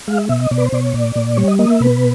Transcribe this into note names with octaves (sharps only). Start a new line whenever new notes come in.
G#3 F5
E5
B2 E5
D#5
B2 D5
B4
C5
B2 D5
C#5
A#2 D5
A#2
G3 C#5
D#5
A#3 D#5
E5
B2 B4